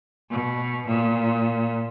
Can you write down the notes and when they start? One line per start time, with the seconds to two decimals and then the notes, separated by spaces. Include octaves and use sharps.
0.31 B2
0.87 A#2